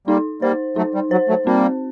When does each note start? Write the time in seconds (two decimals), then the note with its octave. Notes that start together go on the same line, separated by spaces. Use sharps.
0.07 G3 A#3 D#4
0.42 G3 A#3 C5
0.76 F#3 A3 D#4
0.95 G3
1.11 F#3 C5
1.29 F#3 A3
1.46 G3 A#3 C4